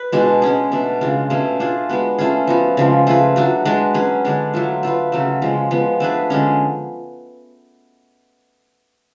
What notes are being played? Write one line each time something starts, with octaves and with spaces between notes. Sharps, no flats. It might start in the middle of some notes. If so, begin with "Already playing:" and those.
Already playing: B4
B2 G#3 D4 F#4
G#3 C#4 G#4
B2 A3 D4
C#3 G#3 D4 F4
B2 A3 C#4 G#4
A3 D4 F4 G#4
G#3 B3 F#4
A3 C#4 F4 G#4
F3 B3 F#4
C#3 F3 G#3
A3 F4 G#4 B4
F#3 A3 D4 F#4
G#3 D4 F#4 B4
F#3 C#4 G#4 B4
D3 G#3 D4 G#4
F#3 A3 F4
A3 F4 B4
C#3 F#3 A3
C#3 F3 G#3
F3 G#3 B3
A3 D4 G#4 B4
D3 G#3 C#4